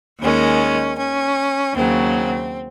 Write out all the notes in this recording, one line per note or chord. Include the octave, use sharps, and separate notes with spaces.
D#2 D#3 G#3 C#4
C#4
D#2 C#3 F#3 C4